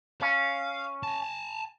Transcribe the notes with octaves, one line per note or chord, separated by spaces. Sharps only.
C#4 F5
G#5 A5